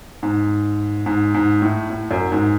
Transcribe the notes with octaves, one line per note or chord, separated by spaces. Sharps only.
G#2
G#2
G#2
A2
A2
F#2
G#2